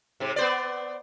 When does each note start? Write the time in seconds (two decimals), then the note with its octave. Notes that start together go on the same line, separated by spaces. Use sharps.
0.20 G#2 C3
0.36 B3 C5 D5